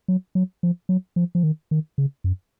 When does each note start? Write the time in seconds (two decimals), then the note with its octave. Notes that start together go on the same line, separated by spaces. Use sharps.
0.08 F#3
0.35 F#3
0.63 F3
0.89 F#3
1.16 F3
1.35 F3
1.43 D#3
1.71 D#3
1.98 C#3
2.24 F#2